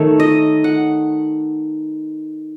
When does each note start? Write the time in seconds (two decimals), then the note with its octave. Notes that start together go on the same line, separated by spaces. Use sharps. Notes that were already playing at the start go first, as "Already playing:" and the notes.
Already playing: D#3 A3 C#5
0.20 D#5
0.64 F#5